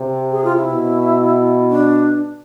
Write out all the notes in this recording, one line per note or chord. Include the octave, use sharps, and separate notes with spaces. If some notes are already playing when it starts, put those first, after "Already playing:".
Already playing: C3
G#4
F4
E4
B2
D4